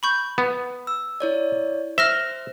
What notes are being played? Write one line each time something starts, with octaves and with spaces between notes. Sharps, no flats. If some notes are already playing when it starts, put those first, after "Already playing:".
B5 C#6 G6
B3
E6
E4 C#5 D5
C5 E5 F6 A#6 G7